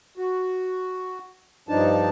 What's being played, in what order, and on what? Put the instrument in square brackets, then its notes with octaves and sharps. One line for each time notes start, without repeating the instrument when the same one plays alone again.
[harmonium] F#4
G2 F3 D4 D#4 A5